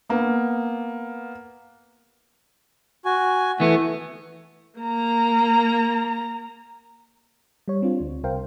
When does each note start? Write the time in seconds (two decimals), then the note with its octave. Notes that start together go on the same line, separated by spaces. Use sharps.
0.10 A#3 B3
3.05 F#4 G#5
3.60 E3 A3 B3
4.79 A#3 A#5
7.68 G3 C#5
7.82 C4 D4 F4
8.00 D2
8.24 C2 A#4 C5 F5 G5